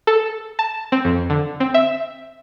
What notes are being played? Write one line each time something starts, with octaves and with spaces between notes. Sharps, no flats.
A4
A5
C4
F2
D3
C4
E5